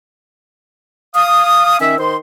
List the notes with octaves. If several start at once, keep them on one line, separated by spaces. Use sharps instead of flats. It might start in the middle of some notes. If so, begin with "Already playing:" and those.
F5 D#6
D#3 C#4 E5
D#3 C5 C6